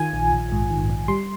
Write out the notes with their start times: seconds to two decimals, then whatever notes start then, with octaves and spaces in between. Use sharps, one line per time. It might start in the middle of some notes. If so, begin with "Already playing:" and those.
Already playing: D#3 F4 G#5
0.13 A#1
0.32 A#1
0.52 G#2
0.70 D#3
0.90 A#1
1.08 G3 C6